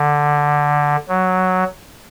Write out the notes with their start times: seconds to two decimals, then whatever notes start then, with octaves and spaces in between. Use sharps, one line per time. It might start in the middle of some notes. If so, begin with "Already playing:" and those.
Already playing: D3
1.08 F#3